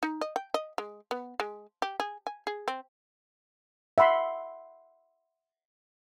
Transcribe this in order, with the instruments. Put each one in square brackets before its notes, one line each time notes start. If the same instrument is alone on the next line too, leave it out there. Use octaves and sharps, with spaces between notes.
[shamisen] D#4
D#5
G5
D#5
G#3
B3
G#3
G4
G#4
G#5
G#4
C4
[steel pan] E5 F#5 B5 C6